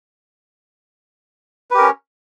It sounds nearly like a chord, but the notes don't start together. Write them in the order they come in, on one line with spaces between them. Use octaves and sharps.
B4 G4 A#4 C#4